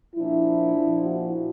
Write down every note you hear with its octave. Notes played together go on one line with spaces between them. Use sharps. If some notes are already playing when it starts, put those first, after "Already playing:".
A#2 F3 D4 E4
A#2 F3
E4 F#4